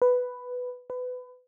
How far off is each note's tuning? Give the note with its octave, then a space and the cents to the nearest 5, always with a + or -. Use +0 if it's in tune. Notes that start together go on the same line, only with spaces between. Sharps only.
B4 +5
B4 +20